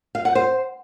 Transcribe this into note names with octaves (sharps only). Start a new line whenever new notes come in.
F5
F#5
C5